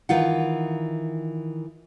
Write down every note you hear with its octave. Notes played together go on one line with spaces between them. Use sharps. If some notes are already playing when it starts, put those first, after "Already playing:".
D#3 E3 F4 F#5